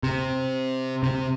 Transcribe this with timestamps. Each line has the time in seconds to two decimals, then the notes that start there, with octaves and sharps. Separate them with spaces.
0.03 C3
1.03 C3